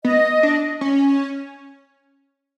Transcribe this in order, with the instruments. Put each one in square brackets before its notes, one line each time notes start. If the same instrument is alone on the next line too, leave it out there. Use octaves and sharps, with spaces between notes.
[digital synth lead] B3 [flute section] D#5
[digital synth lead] D4
C#4